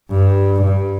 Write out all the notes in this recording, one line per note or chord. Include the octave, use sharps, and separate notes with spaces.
G2
G2